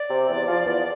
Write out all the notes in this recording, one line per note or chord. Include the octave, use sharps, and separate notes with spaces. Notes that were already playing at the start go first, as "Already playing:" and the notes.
Already playing: D5
C3
E2
F3
E2